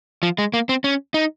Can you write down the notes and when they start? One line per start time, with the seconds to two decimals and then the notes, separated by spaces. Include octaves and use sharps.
0.23 F3
0.38 G#3
0.54 A#3
0.69 C4
0.84 C#4
1.14 D#4